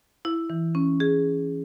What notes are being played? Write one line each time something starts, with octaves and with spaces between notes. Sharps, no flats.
E4
E3
C#4
G#4